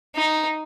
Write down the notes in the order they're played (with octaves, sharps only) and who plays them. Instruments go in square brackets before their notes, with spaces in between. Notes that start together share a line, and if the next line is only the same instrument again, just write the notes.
[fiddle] D#4